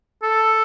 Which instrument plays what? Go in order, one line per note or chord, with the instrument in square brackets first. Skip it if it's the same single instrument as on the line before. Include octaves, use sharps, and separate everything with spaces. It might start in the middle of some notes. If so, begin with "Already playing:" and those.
[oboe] A4